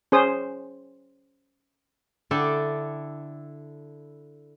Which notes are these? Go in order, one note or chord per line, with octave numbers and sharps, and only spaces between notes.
C#4 G#4 C5 D#6
D3 E4 A4 D5 G5